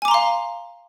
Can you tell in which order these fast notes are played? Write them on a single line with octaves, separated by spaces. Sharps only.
G#5 D6 A#5 C6 F5